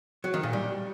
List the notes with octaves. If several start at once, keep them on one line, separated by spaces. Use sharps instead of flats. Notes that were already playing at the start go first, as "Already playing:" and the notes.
F#3
D#3
A#2
G3